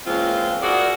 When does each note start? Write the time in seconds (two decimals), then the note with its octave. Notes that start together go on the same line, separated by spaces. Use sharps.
0.07 E3 G#3 A#3 C4 C#4 F4
0.62 E4 F#4 G#4 A#4 C5 D5